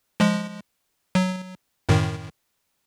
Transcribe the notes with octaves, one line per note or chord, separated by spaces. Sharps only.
F3 G#3
F#3
F#2 A2 D#3